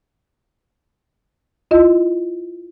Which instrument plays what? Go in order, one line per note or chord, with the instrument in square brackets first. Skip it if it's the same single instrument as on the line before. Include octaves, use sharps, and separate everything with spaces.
[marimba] E4 F4 D#5